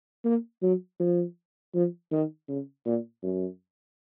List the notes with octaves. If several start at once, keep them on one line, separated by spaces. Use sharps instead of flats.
A#3
F#3
F3
F3
D#3
C#3
A#2
F#2